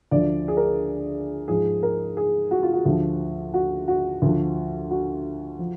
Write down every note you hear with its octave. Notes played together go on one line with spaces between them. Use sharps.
D2 D3 F3 D5
G#4
A#4
G#2 F3 G#4
A#4
G#4
F#4
F4
F#4
D2 D3 F3
F#4
F#4
D2 D3 F3
F#4
F3